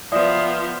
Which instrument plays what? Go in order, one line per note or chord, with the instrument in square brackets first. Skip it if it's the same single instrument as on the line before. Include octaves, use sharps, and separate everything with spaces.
[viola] F3 B3 [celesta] D5 E5 D#6